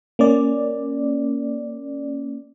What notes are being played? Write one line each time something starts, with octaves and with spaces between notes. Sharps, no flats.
A#3 C#4 D5